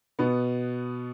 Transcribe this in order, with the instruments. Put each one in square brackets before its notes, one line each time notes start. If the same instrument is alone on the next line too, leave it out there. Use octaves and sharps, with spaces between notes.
[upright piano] B2 B3